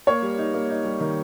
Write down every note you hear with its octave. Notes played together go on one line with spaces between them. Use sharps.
A#3 C#5
G3
D#4
A#3
D#4
G3
D#3